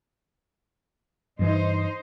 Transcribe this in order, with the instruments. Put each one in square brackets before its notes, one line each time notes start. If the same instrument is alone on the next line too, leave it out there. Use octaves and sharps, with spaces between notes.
[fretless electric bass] G2 E3 [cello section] D#4 C5